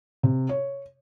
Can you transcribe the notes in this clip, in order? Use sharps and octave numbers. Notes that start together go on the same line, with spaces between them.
C3
C#5